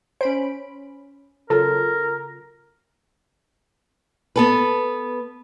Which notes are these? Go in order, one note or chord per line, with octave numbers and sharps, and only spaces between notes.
C#4 C5 B5 D7
C#3 F#3 F4 A4 A#4
B3 A4 B4